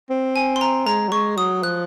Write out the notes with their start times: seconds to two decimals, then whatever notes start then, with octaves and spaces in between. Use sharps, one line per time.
0.10 C4
0.36 G#5
0.56 C6
0.61 A#5
0.86 G#3 A#5
1.08 F#3
1.12 G#3 C#6
1.37 F#3 D#6
1.63 F3 F#6